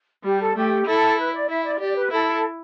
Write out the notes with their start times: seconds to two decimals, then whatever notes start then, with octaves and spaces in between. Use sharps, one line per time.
0.23 G3 G4
0.40 A4
0.55 A3 G4
0.86 E4 A4
1.17 B4
1.33 D5
1.48 E4 E5
1.64 D5
1.79 G4 D5
1.95 B4
2.11 E4 A4